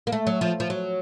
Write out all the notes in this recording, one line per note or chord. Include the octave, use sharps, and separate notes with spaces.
A#3
A3
F#3
F3
F3
F#3